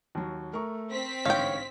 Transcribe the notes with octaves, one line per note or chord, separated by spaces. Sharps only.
D#2 F#3
A3 A#4 C#6
C4 B6
A1 G#2 D3 C#5 F5 G5